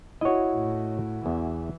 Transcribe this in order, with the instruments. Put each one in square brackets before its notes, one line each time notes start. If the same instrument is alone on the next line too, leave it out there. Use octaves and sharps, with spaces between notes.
[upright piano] E4 F#4 [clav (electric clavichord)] C#5 D#5
[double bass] A2
[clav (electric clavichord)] E2 [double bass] E3